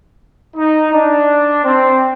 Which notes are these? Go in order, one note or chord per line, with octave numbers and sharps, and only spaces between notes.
D#4
D4
C4